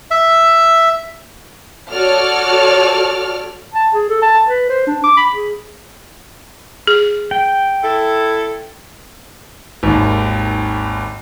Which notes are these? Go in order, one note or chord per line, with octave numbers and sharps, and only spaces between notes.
E5
F#4 A4 C#5 D5 F6
A5
G#4
A4
A5
B4
C5
D4
D6
B5
G#4
G#4
G5
E4 A4
G#1 D#2